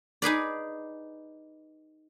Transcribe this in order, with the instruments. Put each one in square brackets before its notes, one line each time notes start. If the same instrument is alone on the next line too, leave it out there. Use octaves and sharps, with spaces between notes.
[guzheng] D#4 G#4 B4 D5